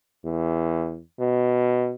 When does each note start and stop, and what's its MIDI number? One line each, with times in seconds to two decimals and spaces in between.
0.25 0.99 40
1.20 1.94 47